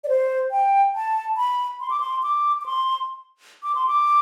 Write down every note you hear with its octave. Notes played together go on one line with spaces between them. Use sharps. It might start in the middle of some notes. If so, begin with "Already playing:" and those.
D5
C5
G5
A5
B5
C6
D6
C6
D6
D6
C6
D6
C6
D6